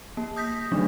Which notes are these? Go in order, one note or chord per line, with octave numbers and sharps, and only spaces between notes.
A#3
D#6 G6 A#6 B6
D3 D#3 F#3 A3 D4 D#4